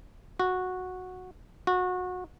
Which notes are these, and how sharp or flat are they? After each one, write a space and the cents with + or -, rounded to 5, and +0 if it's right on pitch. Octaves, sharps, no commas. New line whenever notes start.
F#4 -10
F#4 -25